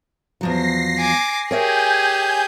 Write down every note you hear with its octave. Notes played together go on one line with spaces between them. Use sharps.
E2 F3 F#3 A#6 C7
G#5 D6
G4 G#4 A#4 C#5 E5 G#5 G6